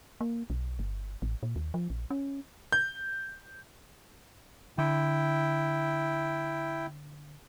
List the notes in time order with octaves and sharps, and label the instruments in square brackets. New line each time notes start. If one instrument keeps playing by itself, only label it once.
[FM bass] A#3
B1
G1
A1
A#2
D#2
F3
A#1
C#4
[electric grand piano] G6
[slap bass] D3 [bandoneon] E4 G5